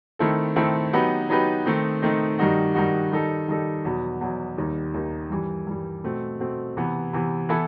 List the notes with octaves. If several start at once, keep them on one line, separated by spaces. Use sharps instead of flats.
D#3 A3 C4 E4 A4
D#3 A3 C4 E4 A4
F#3 B3 D#4 G4 B4
F#3 B3 D#4 G4 B4
D#3 A3 C4 D#4
D#3 A3 C4 D#4
G2 D#3 G3 D#4 F#4
G2 D#3 G3 D#4 F#4
D#3 G3 D#4 A4
D#3 G3 D#4 A4
E2 B2 F#3 B3
E2 B2 F#3 B3
D#2 D#3 G3 D#4
D#2 D#3 G3 D#4
G2 E3 G3
G2 E3 G3
B2 A3 C4
B2 A3 C4
C3 E3 B3
C3 E3 B3
E3 B3 E4 A4